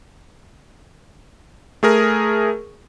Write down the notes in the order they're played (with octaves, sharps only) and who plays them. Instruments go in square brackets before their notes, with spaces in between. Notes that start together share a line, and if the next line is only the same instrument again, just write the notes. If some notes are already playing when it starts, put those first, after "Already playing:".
[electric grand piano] A3 G#4 A#4